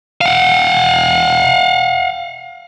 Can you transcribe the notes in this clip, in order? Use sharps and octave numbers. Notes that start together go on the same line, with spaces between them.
F5 F#5